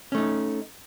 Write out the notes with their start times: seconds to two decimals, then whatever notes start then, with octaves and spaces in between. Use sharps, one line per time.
0.12 C#4
0.15 A3
0.17 D#4